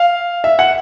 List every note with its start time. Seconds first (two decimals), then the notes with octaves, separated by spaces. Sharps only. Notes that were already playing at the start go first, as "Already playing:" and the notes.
Already playing: F5
0.44 E5
0.59 F#5